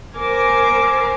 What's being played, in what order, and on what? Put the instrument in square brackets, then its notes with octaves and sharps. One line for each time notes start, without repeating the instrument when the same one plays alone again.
[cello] A#4 C5 [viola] G#5 D6